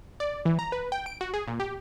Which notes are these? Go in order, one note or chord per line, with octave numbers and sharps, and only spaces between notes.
D5
E3
A#5
B4
G5
D7
F#4
G#4
A#2
G4